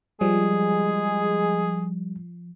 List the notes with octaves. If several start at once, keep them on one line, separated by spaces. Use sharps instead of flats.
F3 G3 G#3 G#4